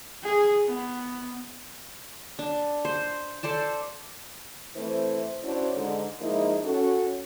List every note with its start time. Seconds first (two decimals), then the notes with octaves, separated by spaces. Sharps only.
0.23 G#4
0.66 B3
2.39 D4
2.85 C5
3.43 A4 C5 D5 A5
4.76 E3 A3 C4 C5
5.42 C#4 D4 E4 F#4 C5 C#5
5.74 G#2 D3
6.20 F3 G#3 A#3 D#4 E4
6.64 C#4 F#4 A4